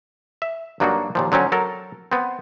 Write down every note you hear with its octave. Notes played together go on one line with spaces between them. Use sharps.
E5
G2 F#3 A#3 D4 D#4 F#4
D#2 A#2 F3
D3 F#3 C4 C#4
F#3 A4 A#4
B3 C4